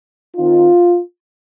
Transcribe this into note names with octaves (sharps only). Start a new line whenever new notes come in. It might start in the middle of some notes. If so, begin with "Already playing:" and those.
D#3 C4 D#4 F4